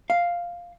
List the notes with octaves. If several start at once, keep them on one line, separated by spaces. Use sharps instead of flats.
F5